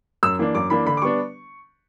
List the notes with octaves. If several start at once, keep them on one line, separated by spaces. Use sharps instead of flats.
F#2 E6
E3 A#3 D4
F#2 D6
E3 A#3 D4 B5
D3 B5
D6
G3 B3 D4 C#6